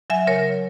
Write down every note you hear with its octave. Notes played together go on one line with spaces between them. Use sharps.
F#3 E5 G#5
C#3 A#4 C#5
F#3